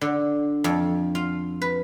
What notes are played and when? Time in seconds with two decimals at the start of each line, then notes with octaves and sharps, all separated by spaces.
0.01 D3
0.64 F2
1.15 F4
1.62 B4